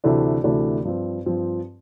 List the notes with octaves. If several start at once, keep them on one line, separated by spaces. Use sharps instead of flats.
D2 C3 E3 A3 D4
D2 C3 E3 A3 D4
G2 F3 C4
G2 F3 C4